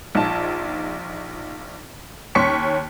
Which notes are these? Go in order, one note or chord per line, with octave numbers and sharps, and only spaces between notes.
A#1 D#4 F4 A5
D#2 C#4 C6 C#6 B6 C#7